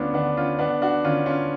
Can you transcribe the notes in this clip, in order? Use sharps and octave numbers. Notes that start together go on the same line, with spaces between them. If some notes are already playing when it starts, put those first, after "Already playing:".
Already playing: D2 B3 C#4 D4 F4
D3 B3 D4
C#4 F4
D3 B3 D4
D4 F#4
D3 C#4 F4
C#4 F4